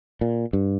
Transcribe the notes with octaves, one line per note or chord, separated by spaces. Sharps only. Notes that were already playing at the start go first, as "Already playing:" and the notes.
A#2
G2